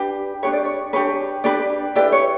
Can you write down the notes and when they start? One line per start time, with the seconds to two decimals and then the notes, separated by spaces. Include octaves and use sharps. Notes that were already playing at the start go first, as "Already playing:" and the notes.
Already playing: D4 G4 B4
0.43 D4 G4 B4 C#5
0.53 D5
0.65 C#5
0.93 D4 G4 B4 C#5
1.44 D4 G4 B4 D5
1.95 E4 G4 B4 D5
2.12 C#5